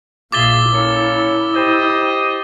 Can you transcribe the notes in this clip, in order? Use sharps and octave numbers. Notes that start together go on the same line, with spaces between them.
A#1 A#2 F4 G#4 E5 D6 A6 G7
A#3 C#4 E4 A4
G4 C5 D#5